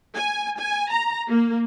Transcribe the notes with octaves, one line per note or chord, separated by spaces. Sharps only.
G#5
G#5
A#5
A#3